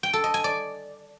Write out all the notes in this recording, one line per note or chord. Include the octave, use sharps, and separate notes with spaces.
G5
A4
D#5
G#5
D5